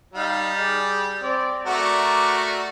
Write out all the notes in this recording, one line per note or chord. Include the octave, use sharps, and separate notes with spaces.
G3 D#4 F5
G#4 D5
C4 D5
A3 F#4 A#4 D5